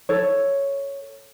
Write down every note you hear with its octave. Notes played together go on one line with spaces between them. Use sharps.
A4 C#5